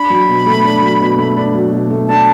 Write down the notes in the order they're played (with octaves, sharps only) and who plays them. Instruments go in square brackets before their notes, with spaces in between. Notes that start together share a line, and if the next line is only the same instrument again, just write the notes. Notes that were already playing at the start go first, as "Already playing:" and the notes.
Already playing: [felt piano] D4 [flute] B5
[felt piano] F#3
B2
A3
D4
F#3
B2
A3
D4
F#3
B2
A3
[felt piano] D4 [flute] A5